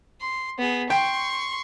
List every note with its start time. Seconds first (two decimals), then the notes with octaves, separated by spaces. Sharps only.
0.21 C6
0.58 B3 G#4
0.90 G5 C6 C#6